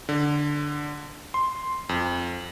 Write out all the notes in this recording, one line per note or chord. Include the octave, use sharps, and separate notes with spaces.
D3
C6
F2